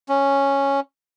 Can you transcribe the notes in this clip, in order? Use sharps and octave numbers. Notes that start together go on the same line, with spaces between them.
C#4